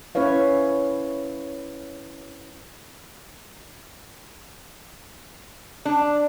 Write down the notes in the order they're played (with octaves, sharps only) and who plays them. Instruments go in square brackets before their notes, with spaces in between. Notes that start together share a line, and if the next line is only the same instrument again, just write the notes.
[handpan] C#4 E4 B4 C#5 F5
[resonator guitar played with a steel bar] D4